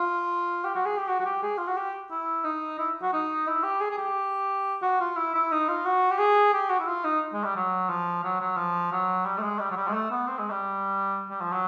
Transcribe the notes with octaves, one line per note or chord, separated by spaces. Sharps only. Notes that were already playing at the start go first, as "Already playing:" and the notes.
Already playing: F4
G4
F#4
G#4
G4
F#4
F#4
G4
G#4
F4
F#4
G4
E4
D#4
E4
F#4
D#4
E4
G4
G#4
G#4
G4
F#4
F4
E4
E4
D#4
F4
F#4
G4
G#4
G4
F#4
E4
F4
D#4
G#3
G3
F#3
F3
F#3
F#3
F3
F#3
G3
A3
G#3
G3
F#3
G3
G#3
A3
B3
C4
G#3
G3
G3
F3
F#3